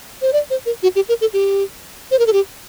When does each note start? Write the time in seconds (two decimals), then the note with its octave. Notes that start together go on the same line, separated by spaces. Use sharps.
0.22 C5
0.33 D5
0.50 C5
0.66 A#4
0.83 F#4
0.96 G4
1.09 A#4
1.21 A4
1.33 G4
2.11 C5
2.19 A#4
2.27 A4
2.33 G4